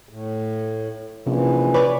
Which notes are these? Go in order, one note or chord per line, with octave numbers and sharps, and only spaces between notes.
A2
A#1 C3 E3 C#4
B4 C#5 D5